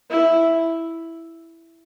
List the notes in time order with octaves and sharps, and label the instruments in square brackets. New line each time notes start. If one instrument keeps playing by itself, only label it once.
[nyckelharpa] E4